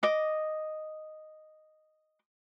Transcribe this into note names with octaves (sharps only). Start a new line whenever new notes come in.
D#5 D6